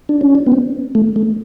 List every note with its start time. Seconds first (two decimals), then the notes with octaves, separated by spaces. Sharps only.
0.09 D4
0.21 C#4
0.35 D4
0.47 B3
0.52 C4
0.95 A3
1.16 A3